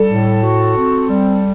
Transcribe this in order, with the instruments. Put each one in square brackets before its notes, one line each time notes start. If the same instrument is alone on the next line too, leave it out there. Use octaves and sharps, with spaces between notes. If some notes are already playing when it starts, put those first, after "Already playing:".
Already playing: [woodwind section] G3 [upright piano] A4
[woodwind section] A2
F#4
C4
G3